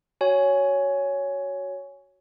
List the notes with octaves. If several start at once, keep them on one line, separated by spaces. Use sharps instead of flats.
F#4 C#5 G#5